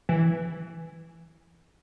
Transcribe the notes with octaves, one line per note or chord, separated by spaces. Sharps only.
E3